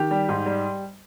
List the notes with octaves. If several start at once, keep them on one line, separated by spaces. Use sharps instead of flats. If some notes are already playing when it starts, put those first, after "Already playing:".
Already playing: D#3 G4
G3
G#2
G3